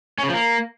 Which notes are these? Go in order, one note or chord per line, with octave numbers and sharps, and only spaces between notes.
C#4
C#3
F3
A#3